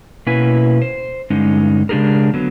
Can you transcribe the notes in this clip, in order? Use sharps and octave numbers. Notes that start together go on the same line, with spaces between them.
B2 A#3 C#4 E4 B4 G#5
C5
G2 D3 G#3 C#4 D#4
C#3 G#3 D4 G4 G#4 A#4
D3 F#3 B3